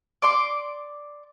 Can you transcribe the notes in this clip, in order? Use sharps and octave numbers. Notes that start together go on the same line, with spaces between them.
D5 C6 D6